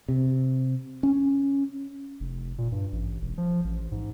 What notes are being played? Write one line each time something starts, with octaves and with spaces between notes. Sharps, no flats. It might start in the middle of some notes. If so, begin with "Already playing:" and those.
C3
C#4
F1
A#2
G2
A1
E1
F3
A1
G#2